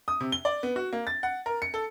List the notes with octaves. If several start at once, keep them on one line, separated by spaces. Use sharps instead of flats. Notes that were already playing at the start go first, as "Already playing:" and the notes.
D#6
C3
G7
D5
B3
F#4
A#3
A6
F#5
A#4
C#7
A4